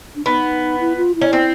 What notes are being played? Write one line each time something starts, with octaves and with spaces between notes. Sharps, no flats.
D4
B3 D#4
E4
F4
E4
C#4
C4